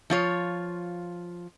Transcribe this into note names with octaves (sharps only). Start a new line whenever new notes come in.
F3 F4 C#5